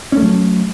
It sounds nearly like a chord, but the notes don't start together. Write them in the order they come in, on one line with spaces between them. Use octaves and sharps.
C#4 A3 F#3